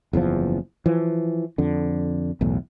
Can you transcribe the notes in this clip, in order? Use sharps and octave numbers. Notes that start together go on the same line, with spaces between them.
F#1 E2 G#2 F3
E3 F3
F2 D3
B1 E2 A2